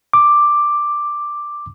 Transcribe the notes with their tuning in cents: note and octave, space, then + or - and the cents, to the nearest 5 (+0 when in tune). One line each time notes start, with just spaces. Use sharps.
D6 +5